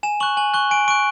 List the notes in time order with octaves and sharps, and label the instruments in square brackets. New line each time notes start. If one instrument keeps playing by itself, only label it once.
[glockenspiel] G#5 E7
C#6 F#6 F#7
G#5 F#7
C#6 F#6 G7
G#5 D7
C#6 D7
F#6